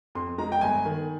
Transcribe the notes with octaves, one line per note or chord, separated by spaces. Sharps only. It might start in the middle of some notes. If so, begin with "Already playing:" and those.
F2 C6
G#3 A#5
G5
G1 G#5
D#3